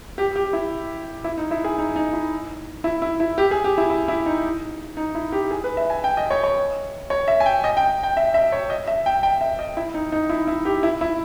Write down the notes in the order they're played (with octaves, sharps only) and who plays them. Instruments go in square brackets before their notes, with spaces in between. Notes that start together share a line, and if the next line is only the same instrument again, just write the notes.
[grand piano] G4
G4
E4
E4
D#4
E4
G#4
D#4
D#4
E4
E4
E4
E4
G4
G#4
G4
E4
E4
E4
D#4
D#4
E4
G4
G#4
B4
E5
G#5
G5
D#5
C#5
C#5
C#5
E5
G#5
G5
D#5
G5
G5
E5
E5
C#5
D#5
E5
G5
G5
E5
D#5
E4
D#4
D#4
E4
E4
G4
E4
E4